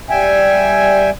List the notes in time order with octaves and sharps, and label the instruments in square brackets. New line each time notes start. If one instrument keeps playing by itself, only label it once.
[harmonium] G3 E5 G5 G#5